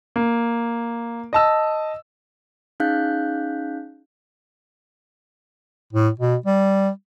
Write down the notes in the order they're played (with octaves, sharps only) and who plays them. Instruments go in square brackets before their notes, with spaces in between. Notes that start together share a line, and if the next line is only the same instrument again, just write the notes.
[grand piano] A#3
D#5 A5 E6
[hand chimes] C#4 D#4 G#4 F5 F#6 G6
[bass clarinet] A2
B2
G3